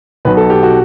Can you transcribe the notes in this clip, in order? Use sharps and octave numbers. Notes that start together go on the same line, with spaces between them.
B1 B2 B4
A4
G4
F#4